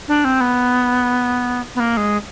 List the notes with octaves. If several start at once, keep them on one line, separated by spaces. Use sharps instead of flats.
D4
C4
B3
B3
A#3
G#3